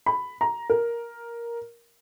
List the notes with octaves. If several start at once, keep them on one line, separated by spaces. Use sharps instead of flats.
B5
A#5
A#4